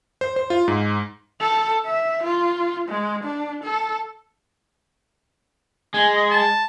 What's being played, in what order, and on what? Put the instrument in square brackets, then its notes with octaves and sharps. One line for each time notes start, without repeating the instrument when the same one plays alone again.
[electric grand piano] C5
C5
F4
G#2
[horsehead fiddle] A4
E5
F4
G#3
D4
A4
[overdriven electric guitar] G#3 [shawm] G#5
[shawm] D#5
A5